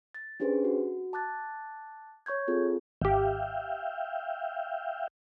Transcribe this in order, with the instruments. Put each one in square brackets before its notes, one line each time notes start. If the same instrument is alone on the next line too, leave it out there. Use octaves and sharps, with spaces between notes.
[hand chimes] A6
C#4 D4 G4 G#4 B4 C5
F#4
A5 D6 F#6 A6
C#5 C#6 G6 G#6
C4 F4 G#4 A4
[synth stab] G#1 G4 [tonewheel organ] E5 F5 G5